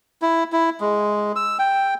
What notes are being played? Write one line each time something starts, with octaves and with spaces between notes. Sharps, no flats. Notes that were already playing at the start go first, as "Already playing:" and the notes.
E4
E4
G#3
E6
G5